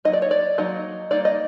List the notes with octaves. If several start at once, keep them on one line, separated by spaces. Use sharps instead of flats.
F#3 A#3 D#4 D#5
D5
C#5
D5
F#3 A#3 D#4 D#5
G3 A#3 D#4 D5
D#5